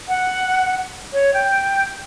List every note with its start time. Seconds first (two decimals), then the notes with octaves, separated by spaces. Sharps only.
0.08 F#5
1.13 C#5
1.33 G5